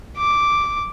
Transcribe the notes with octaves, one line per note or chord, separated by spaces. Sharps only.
D6